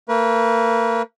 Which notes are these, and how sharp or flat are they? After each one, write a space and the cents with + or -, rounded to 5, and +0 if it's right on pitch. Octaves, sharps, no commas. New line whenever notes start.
A#3 -40 B4 -35